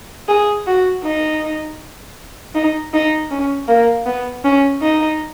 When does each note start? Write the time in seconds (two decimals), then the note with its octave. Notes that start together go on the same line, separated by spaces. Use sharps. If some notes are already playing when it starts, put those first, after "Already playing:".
0.28 G#4
0.67 F#4
1.05 D#4
2.55 D#4
2.94 D#4
3.31 C#4
3.68 A#3
4.06 B3
4.45 C#4
4.82 D#4